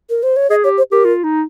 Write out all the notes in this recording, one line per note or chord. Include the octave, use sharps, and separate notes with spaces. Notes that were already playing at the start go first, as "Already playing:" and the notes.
A#4
C5
C#5
G#4 D#5
G4 C#5
C5
G4 A#4
F4
D#4